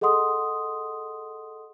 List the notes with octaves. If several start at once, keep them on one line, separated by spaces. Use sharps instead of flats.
G#4 A4 D#5 F#5 C6 D#6